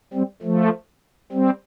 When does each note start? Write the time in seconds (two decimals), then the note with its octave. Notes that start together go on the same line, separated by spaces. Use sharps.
0.14 G3 C4
0.42 F3 A3
1.32 G3 C4